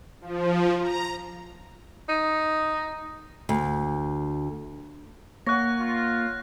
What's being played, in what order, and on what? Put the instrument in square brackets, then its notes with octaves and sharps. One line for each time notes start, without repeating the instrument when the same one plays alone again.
[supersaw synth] F3
A#5
[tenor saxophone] D#4
[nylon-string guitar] D2
[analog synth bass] A#3 [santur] C#5 F#5 [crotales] F#6 A#6
[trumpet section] F4